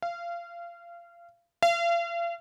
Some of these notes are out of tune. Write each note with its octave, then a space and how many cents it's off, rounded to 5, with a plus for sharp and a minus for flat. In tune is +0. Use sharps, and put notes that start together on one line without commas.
F5 -25
F5 -40